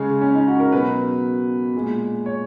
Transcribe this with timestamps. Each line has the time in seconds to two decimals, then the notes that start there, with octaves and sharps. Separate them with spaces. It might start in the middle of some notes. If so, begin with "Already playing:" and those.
Already playing: C#3 G#3 C#4
0.21 C#4
0.34 D#4
0.47 F#4
0.60 A#4
0.72 B2 F#3 B4
1.75 A#2 G#3
2.26 C#5